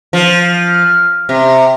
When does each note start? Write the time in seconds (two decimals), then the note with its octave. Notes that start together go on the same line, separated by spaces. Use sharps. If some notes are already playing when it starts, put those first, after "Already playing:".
0.13 F3
1.29 C3